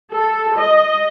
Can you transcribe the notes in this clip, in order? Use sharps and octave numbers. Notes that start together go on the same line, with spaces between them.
A4
D#5